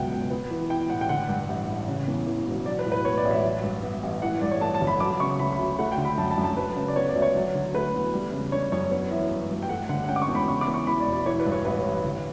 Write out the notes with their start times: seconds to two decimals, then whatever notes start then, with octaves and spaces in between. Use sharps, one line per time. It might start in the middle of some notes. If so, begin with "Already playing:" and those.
Already playing: G1 C#2 B2 F#3 F#5 G5
0.11 C#2
0.30 B3
0.51 E3
0.70 E4 G5
0.90 A2 F#5
1.01 G5
1.09 D3 F#5
1.29 G2
1.48 A1
1.68 A1
1.88 C#3
2.08 E2
2.26 E3
2.46 E1
2.66 F#3 D5
2.79 B4
2.85 A2
2.92 B4
3.05 B3 C#5
3.18 D5
3.25 A1
3.31 E5
3.44 F#3
3.63 G2
3.83 B3
4.03 A1
4.22 E3 F#5
4.41 G2 D5
4.51 C#5
4.61 A3 A5
4.74 A5
4.81 G1
4.87 B5
5.00 F#3 D6
5.20 C#3 C#6
5.39 D2 B5
5.52 B5
5.59 D2
5.79 A3 F#5
5.92 G5
5.98 D3
6.05 B5
6.18 F#2 A5
6.31 A5
6.38 F#2
6.44 A5
6.57 F#3 B4
6.76 C#3
6.88 D5
6.96 B3 C#5
7.09 D5
7.15 D2
7.22 C#5
7.35 F#3
7.55 D3
7.74 A3 B4
7.94 E2
8.14 G3
8.32 C#3
8.52 D4 C#5
8.72 F#2 C#5
8.91 B3 C#5
9.11 E3 E5
9.31 G2
9.51 G2
9.62 G5
9.69 A3 F#5
9.89 D3 F#5
10.04 F#5
10.09 C#4 G5
10.16 D6
10.22 C#6
10.28 E2
10.35 B5
10.48 C#3 C#6
10.61 D6
10.68 E2
10.74 C#6
10.87 E3 B5
11.00 D5
11.07 E1
11.13 D5
11.26 E3 C#5
11.40 B4
11.46 G2
11.52 C#5
11.65 A1 B4
11.85 A1
12.04 D3